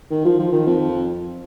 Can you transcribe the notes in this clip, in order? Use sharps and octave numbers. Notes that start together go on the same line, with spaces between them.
D#3
F3
F3
D#3
F2